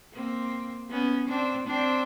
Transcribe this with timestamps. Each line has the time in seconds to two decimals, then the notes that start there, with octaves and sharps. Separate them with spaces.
0.13 A#3 C4
0.90 B3 C#4
1.28 C4 D4
1.67 C4 D4